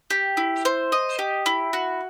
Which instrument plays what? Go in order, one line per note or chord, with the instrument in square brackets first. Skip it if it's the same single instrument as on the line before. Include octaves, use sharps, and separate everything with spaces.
[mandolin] G4
E4
C5
D#5
G4
E4
F#4